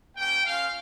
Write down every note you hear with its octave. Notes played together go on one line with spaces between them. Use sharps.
A#3 C#4 G4 G5
A#3 C#4 F4 F5